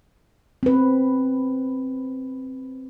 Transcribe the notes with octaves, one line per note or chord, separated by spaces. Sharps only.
C4 B4